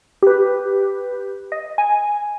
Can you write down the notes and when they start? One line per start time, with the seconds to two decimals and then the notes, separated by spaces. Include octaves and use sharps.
0.23 G4 B4
1.52 D#5
1.78 G#5